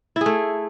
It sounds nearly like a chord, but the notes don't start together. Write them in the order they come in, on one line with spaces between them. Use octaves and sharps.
E4 G#4 A3